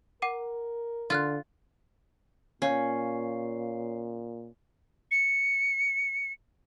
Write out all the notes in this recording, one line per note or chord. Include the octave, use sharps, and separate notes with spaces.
A#4 F#5 D6 D#7
D3 F4 C6 F6 F#6
A#2 C#4 C#5 F5 C7
C#7